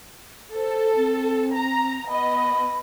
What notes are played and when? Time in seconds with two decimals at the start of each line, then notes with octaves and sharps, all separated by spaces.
0.55 A4 C5
0.96 C4
1.55 A#5
2.09 B3 D#5 B5